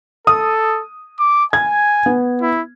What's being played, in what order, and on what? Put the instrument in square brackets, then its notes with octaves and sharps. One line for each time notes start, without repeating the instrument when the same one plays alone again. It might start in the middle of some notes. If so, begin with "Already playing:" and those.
[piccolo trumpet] A4 [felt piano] D#6
[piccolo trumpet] D6
[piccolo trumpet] G#5 [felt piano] G#6
[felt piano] B3
[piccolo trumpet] E4